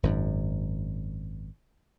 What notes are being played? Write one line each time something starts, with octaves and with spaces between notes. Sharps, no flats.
G#1 F#2